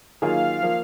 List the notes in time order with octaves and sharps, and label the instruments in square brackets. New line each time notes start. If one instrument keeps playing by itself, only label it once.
[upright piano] D#3 F#3 A#3 F4 G#4 [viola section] F5
[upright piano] F3 A#3